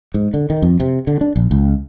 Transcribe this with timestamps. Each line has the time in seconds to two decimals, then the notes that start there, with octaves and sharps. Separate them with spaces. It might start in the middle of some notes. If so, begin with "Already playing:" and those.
0.14 G#2
0.34 D3
0.50 D#3
0.62 F2
0.80 C3
1.07 D3
1.21 D4
1.36 A#1
1.51 C#2